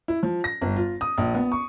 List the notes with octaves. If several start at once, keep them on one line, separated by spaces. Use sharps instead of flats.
E4
F3
A#6
G1
F4
D#6
A#1
B3
C#6